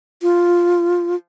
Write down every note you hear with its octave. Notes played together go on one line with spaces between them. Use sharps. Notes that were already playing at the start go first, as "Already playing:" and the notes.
F4